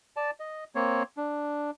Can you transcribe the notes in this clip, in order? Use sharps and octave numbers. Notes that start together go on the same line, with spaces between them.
D5 A5
D#5
A#3 C4 C#5
D4